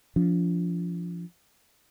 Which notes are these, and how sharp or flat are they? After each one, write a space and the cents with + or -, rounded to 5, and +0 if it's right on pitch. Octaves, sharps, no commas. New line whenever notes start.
F3 -15 D4 -35